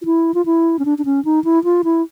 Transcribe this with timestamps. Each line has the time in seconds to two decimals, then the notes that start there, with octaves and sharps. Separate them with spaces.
0.02 F4
0.05 E4
0.34 F4
0.46 E4
0.79 C#4
0.85 D4
0.98 D4
1.05 C#4
1.25 D#4
1.44 E4
1.64 F4
1.84 E4